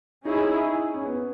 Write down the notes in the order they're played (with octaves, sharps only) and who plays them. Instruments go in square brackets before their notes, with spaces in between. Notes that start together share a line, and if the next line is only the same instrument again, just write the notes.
[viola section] C#4 E4 G#4 [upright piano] D#4
[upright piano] C#4
B3